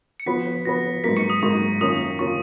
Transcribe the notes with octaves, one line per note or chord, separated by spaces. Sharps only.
C#7
F3 B3 F#4 B4 B6
F3 B3 F#4 B4 A#6
G#2 F#3 A#3 B6
C#6 C#7
D#6
G#2 F#3 A#3 C#6
F#2 D#3 A#3 C#4 F4 D#6
D#3 A#3 C#4 F4 C#6